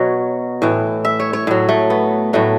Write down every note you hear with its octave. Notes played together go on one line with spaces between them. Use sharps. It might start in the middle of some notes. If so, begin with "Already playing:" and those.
Already playing: B2 F#3 C#5
A2 E3
E5
C#5
C#5
A2 F#3
A3
B3
A2 F#3 A3